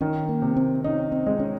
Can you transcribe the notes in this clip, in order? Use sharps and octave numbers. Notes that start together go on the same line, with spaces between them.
D#3 C#4
A#3
C3
C4
C#4 D#4
C4
G#3
C#4